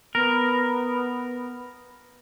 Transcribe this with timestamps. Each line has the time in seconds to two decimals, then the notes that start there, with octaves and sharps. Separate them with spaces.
0.15 B3 A#4